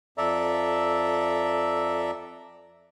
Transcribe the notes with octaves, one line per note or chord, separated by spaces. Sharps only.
F2 A4 D5 E5 A#5